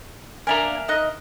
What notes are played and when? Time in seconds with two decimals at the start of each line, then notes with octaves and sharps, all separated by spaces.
0.47 A#3 D4 A#4 E5 G#5 A#5
0.88 D#4 D#5 F#6